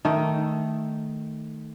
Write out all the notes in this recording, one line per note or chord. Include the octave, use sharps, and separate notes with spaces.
D#3 A3